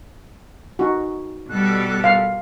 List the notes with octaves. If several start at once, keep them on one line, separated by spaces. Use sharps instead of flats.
D#4 F#4
B2 G3 A4 F#6
F5